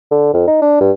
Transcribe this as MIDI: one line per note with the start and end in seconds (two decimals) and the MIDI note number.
0.11 0.30 50
0.34 0.44 41
0.47 0.60 63
0.62 0.80 62
0.81 0.91 43